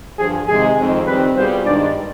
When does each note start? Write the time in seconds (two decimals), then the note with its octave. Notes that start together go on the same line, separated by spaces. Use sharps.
0.18 G2 D3 F3 G#4
0.47 C3 D#3 G#3 G#4
0.77 F2 D#3 G#3 C4
1.06 D#3 G3 C4 B4
1.36 B2 G3 B3 F4 G#4 C5
1.65 G2 D#3 G#3 D4 D5